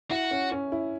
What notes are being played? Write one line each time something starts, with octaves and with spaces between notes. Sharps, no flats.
E4 F#4
C#4
C#4
E4